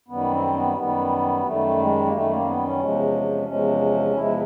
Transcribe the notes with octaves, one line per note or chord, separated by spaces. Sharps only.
F#2 D#3 G3 B3
C4
B3
F#2 D#3 G3 B3
F#2 D#3 G3 A3
G#3
A#3
F#2 D#3 G3 A3
A#3
B3
C#4
E2 C3 F3 G#3
E2 C3 F3 G#3 C#4
E2 C3 F3 G#3 E4